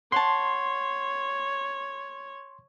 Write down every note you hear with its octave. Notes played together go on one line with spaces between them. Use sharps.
C#5 F#5 A5 C6